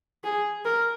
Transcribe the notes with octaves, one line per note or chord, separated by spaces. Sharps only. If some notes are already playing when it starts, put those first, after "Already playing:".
G#4
A#4